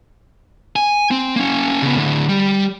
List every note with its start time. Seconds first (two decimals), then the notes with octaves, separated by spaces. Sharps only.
0.76 G#5
1.11 C4
1.36 A#3 C#4
1.82 C#3 B3
1.96 A2 D3
2.29 G3